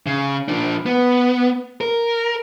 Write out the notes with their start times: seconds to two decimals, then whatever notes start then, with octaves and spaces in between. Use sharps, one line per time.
0.06 C#3
0.48 F3 D4
0.86 B3
1.81 A#4